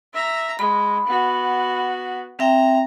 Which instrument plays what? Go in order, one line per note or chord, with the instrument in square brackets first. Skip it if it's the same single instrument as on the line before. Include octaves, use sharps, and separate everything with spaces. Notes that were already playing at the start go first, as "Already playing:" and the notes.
[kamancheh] E5 A#5
[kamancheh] G#3 [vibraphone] B5
[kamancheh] B3 F#4
[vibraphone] C4 E5 G5 [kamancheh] A#5